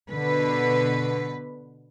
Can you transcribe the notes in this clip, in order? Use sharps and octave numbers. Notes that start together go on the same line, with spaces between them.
B2 D3 B4